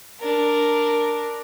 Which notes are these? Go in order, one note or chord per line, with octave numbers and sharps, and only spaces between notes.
D4 A#4